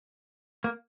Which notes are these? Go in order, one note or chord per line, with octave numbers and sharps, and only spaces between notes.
A#3